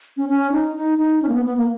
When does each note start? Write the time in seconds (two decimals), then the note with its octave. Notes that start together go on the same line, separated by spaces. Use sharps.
0.17 C#4
0.29 C#4
0.52 D#4
0.76 D#4
0.98 D#4
1.22 C#4
1.29 A#3
1.34 B3
1.45 B3
1.58 A#3